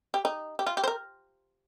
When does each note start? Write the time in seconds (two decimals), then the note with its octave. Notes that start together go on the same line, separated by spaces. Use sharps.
0.14 G4
0.25 D#4
0.59 G4
0.66 F4
0.77 G4
0.84 C5
0.88 A#4